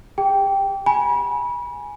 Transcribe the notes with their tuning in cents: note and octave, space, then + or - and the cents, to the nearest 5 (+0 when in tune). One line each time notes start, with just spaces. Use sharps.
G4 +45 G5 +0
G#5 +0 B5 -30